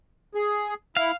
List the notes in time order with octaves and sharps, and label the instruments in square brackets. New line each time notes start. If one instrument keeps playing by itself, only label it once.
[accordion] G#4
[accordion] E4 [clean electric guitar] F5